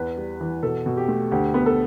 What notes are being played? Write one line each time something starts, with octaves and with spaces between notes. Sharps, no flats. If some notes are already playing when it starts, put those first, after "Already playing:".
Already playing: E2 B4
G3
E3
B2 A4
B2
G4
A3
D2 G4
B3
A4